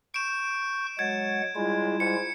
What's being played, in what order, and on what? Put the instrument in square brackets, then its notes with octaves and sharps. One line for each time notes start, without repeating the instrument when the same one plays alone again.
[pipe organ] C#6 G6 [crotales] D7 E7
[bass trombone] F#3 [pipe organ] G#3 F#5 A6 [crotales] G#6
[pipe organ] G3 E4 F4 [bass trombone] G#3
[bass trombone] G#2 [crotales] C#7